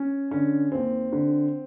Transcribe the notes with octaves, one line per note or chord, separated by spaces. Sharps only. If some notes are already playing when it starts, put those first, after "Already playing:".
Already playing: C#4
D3 C#4
D#2 C4
D3